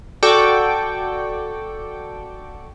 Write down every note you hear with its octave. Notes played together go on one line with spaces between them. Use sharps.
F#4 A4 D5 G5 C#6 D6